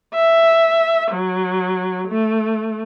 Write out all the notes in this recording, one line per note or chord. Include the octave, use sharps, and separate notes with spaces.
E5
F#3
A3